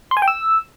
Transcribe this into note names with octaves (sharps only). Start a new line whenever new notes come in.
C6
G#5
G5
E6